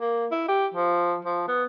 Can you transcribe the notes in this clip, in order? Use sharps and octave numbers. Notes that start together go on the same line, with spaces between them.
A#3
E4
G4
F3
F3
B3